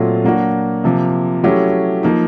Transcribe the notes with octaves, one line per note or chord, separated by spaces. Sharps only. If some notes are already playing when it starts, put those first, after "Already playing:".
Already playing: A#2 F#3 A3 C4 F4
F#3 A#3 D4 F#4
C3 F3 A#3
F#3 A3 C#4 E4 G4
F3 A#3 D#4